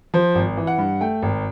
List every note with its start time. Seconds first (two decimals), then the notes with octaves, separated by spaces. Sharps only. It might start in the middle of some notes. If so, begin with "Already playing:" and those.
0.14 F3 C5
0.35 G#1
0.57 E3
0.67 F#5
0.78 G2
1.01 A3 G5
1.22 G#1